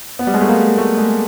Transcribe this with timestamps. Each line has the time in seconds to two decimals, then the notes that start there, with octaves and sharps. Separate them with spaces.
0.19 B3
0.27 G3
0.34 G#3
0.41 A3
0.48 A#3
0.78 A3
0.97 G#3